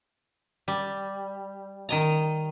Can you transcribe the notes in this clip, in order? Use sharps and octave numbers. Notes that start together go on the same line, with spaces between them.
G3
D#3 D#5 A#5